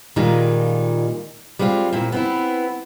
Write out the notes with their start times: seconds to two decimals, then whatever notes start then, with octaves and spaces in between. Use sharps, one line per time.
0.16 A#2 D#3 G3 G#3 D#4 F4
1.59 G3 G#3 C4 F4
1.93 A#2 C4 E4
2.12 B3 C4 E4